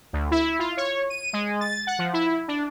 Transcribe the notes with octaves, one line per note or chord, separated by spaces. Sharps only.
D2
E4
F4
C#5
D#7
G#3
A6
F#5
F3
E4
D4